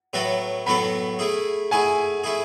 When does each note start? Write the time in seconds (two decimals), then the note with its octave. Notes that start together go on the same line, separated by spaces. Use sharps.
0.13 A2 F#3 B3 F#4 A4
0.66 A2 F#3 B3 F#4 A4 B5
1.19 A3 E4 G#4
1.71 A3 E4 G#4 G#5
2.24 A3 E4 G#4